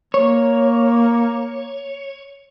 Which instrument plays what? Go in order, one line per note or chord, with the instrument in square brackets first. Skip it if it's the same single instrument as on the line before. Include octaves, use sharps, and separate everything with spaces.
[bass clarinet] A#3 [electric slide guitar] C#5